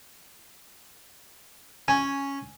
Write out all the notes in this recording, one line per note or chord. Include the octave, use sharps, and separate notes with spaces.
C#4 G#5